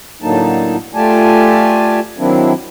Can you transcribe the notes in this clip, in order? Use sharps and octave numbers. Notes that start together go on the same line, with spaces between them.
A2 D3 F#3 A#3 D#4 A5
A3 F4 G4 D5 G#5 A5
D#3 F#3 A#3 C4 D4 E4